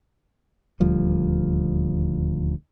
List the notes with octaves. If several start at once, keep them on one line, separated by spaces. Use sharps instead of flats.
D#1 D2 F3 G3